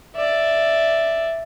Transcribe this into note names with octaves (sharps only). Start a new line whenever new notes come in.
D5 E5